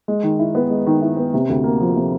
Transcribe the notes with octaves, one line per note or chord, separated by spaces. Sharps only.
G#3
D#3
E4
B3
G#3
D#3
E4
B3
C3
D2
A#3
F3
C3